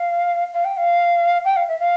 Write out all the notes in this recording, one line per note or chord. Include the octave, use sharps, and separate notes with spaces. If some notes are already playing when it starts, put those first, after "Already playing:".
Already playing: F5
F5
G5
F5
G5
F5
E5
F5